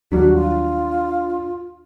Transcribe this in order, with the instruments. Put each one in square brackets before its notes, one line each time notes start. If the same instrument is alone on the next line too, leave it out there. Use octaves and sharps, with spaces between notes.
[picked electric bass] D#2 F#3 G3 [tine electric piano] D4 [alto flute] F#4
[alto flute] F4